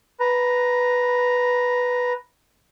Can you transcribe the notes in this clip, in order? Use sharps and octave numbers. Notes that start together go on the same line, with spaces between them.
B4 A#5